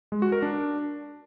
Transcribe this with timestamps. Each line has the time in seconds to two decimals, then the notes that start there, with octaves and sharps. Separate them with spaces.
0.12 G#3
0.22 F#4
0.32 A#4
0.42 D4